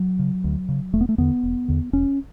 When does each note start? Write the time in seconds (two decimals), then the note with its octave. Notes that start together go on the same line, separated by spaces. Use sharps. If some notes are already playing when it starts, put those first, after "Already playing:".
Already playing: F#3
0.19 C#3
0.44 D2
0.69 C#3
0.93 E1 A3
1.01 B3
1.09 A3
1.18 E2 D3 B3
1.43 E1
1.68 E2 D3
1.93 E1 C#4